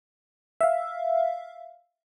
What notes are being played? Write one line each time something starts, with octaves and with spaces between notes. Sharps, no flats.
E5 F5